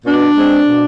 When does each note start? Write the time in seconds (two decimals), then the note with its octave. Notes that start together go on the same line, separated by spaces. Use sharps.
0.04 B2 D4
0.36 G#3 C4
0.67 B2